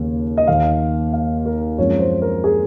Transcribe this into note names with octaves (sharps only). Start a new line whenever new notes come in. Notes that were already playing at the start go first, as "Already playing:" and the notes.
Already playing: D#2 C#3 A#3
D#5
D#2 D#3 A#3 F5
F5
A#4
F#2 F3 G#3 C4 C#5
C5
A#4
G#4